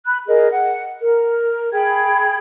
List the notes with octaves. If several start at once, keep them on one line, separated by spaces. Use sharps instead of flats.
B5 F#6
G#4 A#4 D#5
F#5
A#4
G#4 G5 B5 G#6